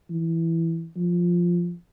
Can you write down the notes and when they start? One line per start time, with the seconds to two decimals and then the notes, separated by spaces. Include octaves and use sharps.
0.10 E3
0.96 F3